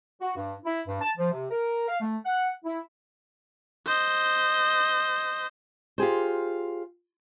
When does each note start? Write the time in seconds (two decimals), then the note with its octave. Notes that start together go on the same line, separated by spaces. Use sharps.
0.21 F#4
0.36 G2
0.65 E4
0.88 G2
1.01 A5
1.18 F3
1.32 C3
1.50 A#4
1.88 F5
2.01 A3
2.25 F#5
2.65 E4
3.87 C5 D#5
5.98 F4 G4 G#4 C5